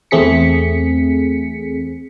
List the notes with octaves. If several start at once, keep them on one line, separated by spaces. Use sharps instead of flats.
E2 A3 C4 G#4 B6 C#7